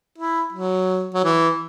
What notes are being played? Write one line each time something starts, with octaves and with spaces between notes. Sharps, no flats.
E4
F#3
F#3
E3